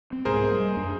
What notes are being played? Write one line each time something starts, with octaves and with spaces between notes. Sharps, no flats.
C4
C2 G#2 B2 G#4 A#4 C5
G3 A#3
F#2 D4